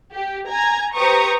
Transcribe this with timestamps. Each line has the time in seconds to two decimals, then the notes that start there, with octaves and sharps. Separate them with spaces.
0.14 G4
0.48 G#5 A#5 G#6
0.95 G4 B4 C5 A#5 C#6 D#6